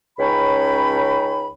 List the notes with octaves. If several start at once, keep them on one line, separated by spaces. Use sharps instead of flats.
C#2 C#4 D#4 C#5 G5 B5